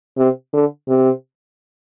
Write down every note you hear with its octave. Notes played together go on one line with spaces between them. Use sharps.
C3
D3
C3